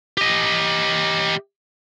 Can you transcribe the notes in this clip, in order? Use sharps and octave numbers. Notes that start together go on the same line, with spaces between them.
G4 D#5